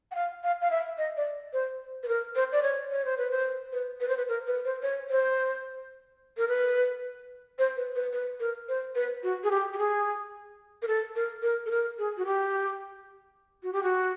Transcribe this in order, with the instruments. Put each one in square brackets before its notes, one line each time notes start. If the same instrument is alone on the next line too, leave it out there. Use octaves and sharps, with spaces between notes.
[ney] F#5
F5
F5
F5
E5
D#5
D5
C5
B4
A#4
C5
D5
C#5
C#5
C5
B4
C5
B4
B4
C5
B4
A#4
B4
C5
C#5
C5
A#4
B4
C5
B4
B4
B4
A#4
C5
B4
F#4
G#4
G4
G4
G#4
A#4
A4
A#4
A#4
A4
A#4
G#4
F#4
G4
F#4
G4
F#4